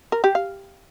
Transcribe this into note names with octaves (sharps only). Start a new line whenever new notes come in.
A#4
G4
F5